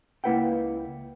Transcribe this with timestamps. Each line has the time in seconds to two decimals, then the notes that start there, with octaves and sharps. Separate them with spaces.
0.24 C#2 A#3 E4 B4 F#5 G5